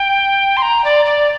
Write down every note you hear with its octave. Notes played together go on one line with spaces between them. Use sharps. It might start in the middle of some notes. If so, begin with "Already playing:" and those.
Already playing: G5
C6
A#5
D5
D5